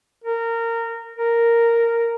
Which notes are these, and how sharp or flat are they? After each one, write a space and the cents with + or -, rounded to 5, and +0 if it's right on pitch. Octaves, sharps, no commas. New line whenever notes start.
A#4 -20
A#4 -5